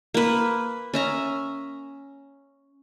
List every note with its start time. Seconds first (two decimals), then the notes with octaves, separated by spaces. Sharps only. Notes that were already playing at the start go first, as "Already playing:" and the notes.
0.14 A#3 B4
0.94 C#4 E5 A#5